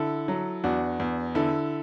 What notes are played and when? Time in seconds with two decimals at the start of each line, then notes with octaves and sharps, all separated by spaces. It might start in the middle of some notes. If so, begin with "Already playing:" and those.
Already playing: D3 E4 A4
0.28 F#3
0.64 E2 D4 F#4
1.00 E2
1.35 D3 E4 A4